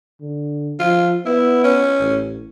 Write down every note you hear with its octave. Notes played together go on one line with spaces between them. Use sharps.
D3
F3 F4
B3 E4
C#4
A1